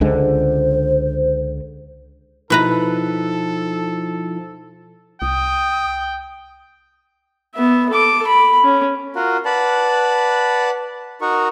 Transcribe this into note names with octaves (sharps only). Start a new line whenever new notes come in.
C#2 D3 G#3 C5
B2 F3 D#4 E4 A4 B4 A#5
C2 G5 D#6
B3 E5
A4 D6
B5
C#4
F4 F#4 A#4
B4 D5 F#5 A5 B5
D#4 F#4 A#4 C#6